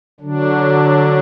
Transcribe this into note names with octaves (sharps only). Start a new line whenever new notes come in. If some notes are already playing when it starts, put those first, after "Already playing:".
D3 F#3 D4